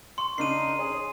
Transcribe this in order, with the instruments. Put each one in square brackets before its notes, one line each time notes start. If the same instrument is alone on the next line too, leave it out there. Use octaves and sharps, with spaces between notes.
[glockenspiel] C6 [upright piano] C#6
[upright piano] C#3 D4 [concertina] D#4 A#4 [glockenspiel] C7 D#7
[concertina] G#4 [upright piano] C#5